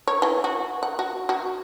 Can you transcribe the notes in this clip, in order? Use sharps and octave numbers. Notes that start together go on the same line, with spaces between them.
C#5
E3
F#4
F#5
F#4
F#4